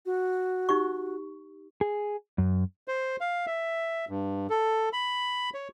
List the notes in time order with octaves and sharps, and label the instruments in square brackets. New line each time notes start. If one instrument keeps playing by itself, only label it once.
[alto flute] F#4
[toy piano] D#4 G4 C#6
[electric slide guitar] G#4
F#2
[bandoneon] C5
F5
E5
G2
A4
B5
C#5